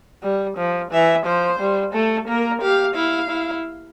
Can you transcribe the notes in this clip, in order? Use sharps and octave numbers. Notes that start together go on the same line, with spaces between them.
G3
F3
E3 E5
F3 C5
G3
A3 A4
A#3 A#4
G4 F5
E4 F5
E4